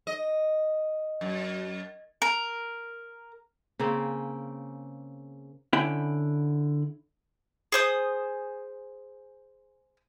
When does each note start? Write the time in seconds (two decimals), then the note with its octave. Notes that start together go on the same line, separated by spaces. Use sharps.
0.07 D#5
1.21 F#2
2.22 A#4
3.79 C#3 A#3 C4 C#4
5.73 D3 C#4 E4 G5 B5
7.72 G#4 C5 D#6